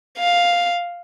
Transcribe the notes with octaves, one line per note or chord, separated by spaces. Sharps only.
F5